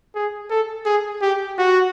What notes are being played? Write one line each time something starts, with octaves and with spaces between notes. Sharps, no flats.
G#4
A4
G#4
G4
F#4